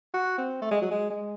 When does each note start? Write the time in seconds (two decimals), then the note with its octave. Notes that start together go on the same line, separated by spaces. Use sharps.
0.14 F#4
0.38 C4
0.62 A3
0.71 G#3
0.82 F#3
0.91 G#3
1.10 G#3